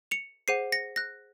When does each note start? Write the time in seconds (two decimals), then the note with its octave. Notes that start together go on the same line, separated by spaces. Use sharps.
0.11 C#7 F7
0.48 G#4 C5 F#5 C7 D#7
0.72 A#6 C#7
0.96 F#6 A#6